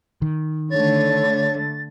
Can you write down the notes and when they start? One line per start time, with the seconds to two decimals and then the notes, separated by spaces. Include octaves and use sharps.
0.22 D#3
0.70 D3 A3 C#5 A6